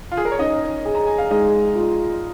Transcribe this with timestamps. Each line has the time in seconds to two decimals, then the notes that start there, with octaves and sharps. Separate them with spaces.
0.12 F4
0.17 G#4
0.25 A#4
0.31 C#5
0.38 C#4 D#4 D#5
0.85 G#4
0.95 A#5
1.07 G#5
1.18 F5
1.30 G#3 D#4 D#5
1.76 F4